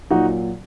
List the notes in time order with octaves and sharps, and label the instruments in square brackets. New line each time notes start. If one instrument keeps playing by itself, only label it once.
[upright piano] A#2 F#3 D#4 F#4